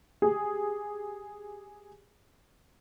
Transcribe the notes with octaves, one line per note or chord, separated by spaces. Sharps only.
G4 G#4